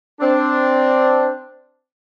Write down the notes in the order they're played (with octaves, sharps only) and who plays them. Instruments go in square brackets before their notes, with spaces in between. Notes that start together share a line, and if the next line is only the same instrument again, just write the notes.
[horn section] C4 D4